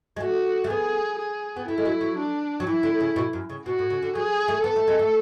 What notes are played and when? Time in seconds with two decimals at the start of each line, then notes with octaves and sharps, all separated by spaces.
0.16 G#3
0.20 A3 F#4
0.64 A3
0.69 B3 G#4
1.19 G#4
1.56 B3
1.68 A3 E4
1.78 G#3
1.85 F#3
2.01 F#3
2.18 D4
2.60 F#3
2.67 E3 E4
2.83 D3
3.00 C#3
3.16 B2
3.33 F#2
3.49 C#3
3.66 B2 F#4
3.79 A2
3.90 C#3
4.02 D3
4.15 F#3 G#4
4.48 A3
4.64 B3 A4
4.76 A3
4.88 G#3
4.99 A3